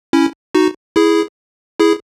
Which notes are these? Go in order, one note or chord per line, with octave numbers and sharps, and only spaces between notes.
C#4 E4
D#4 F#4
E4 G#4
E4 G#4